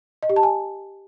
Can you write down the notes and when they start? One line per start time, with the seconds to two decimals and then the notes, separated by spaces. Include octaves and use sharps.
0.23 D#5
0.29 G4
0.36 A5
0.43 G#5